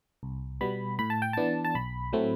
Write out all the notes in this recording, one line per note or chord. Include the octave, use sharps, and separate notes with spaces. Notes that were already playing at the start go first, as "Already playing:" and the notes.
C2
B2 G3 B3 B5
A2 B5
A5
G5
E3 B3 D4 A5
A5
B1 B5
A2 F#3 A3 C4